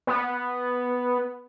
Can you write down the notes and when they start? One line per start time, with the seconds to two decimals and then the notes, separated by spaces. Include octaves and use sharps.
0.07 B3